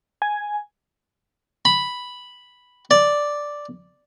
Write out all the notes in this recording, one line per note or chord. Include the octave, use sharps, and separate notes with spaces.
G#5
B5
D5